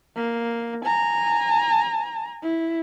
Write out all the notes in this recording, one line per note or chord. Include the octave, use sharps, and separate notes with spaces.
A#3
G#5 A#5
E4